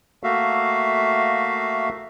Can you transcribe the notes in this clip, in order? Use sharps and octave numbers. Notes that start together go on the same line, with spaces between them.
A3 A#3 F#4 E5 F5